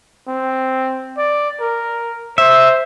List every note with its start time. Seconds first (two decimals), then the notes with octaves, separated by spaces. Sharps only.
0.27 C4
1.17 D5
1.60 A#4
2.38 C5 E5